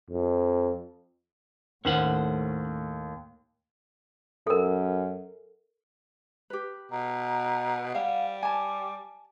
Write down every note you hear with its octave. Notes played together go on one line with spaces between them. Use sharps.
F2
D#2 A2 A3 C#4 C5 F#5
F#2 A4 A#4
G4 B4
B2 A#5
G3 F5 F#5
G#5 A5 D6